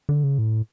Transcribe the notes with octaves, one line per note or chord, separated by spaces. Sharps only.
D3
C#3
A2